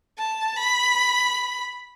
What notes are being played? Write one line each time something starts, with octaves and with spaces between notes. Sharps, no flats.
A5
B5